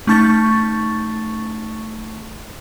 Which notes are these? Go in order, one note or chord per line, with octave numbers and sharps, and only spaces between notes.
A3 C#4 D#4 A5 C#6 A6